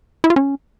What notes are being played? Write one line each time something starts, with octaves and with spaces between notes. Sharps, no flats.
E4
F4
C#4